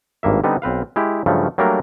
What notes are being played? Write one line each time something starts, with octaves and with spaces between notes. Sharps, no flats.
G#1 G2 A#3 E5
D3 G3 B3 C4 D#4
B1 C4 B4 F5
G#3 E4 G4
G2 C#3 F3 F#3 A3
F#3 G3 A3 A#3 D4 A#4